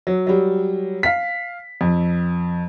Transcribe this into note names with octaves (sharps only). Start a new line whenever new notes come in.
F#3
F#3 G3
F5 B6
F2